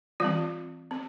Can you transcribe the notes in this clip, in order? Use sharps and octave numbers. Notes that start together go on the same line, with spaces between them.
E3 G3 C4 F4
C4